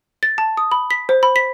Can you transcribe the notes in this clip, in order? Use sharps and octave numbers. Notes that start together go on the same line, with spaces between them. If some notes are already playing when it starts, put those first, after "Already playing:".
A6
A5
D#6
B5
B6
C5
B5
B6